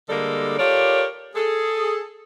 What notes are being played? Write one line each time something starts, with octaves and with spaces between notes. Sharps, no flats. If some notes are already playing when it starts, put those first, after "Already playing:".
D3 G3 G#3 A#3 A4
F4 G4 A4 A#4 C#5 D5
G#4 A4